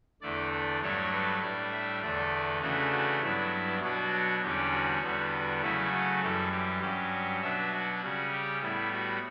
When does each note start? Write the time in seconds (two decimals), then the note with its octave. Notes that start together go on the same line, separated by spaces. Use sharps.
0.22 E2 D3 A3 D5
0.52 D5
0.81 G2 F#3 A3 D4 C#5
1.12 B4
1.41 A2 G3 D4 D5
1.72 E5
2.02 E2 D3 A3 D5
2.62 C#3 E3 A3 D4 F#4
2.92 F#4
3.21 G2 F#3 B3 D4 E4
3.81 B2 F#3 B3 D4 F#4
4.42 E2 D3 G3 C#4 G4
4.72 F#4
5.02 E2 D3 G3 B3
5.62 C#3 F#3 A3 C#4 E4
5.92 F#4
6.22 F#2 E3 G3 A4
6.52 G4
6.81 G2 F#3 C#4 G4
7.42 B2 F#3 B3 D4 E5
7.71 F#4
8.01 C#3 G3 C#4
8.32 G4
8.62 A2 G3 B3 E4
8.92 F#4